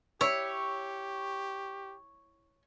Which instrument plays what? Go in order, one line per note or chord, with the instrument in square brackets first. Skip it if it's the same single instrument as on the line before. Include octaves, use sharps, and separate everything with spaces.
[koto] E4 [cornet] G4 [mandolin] C#5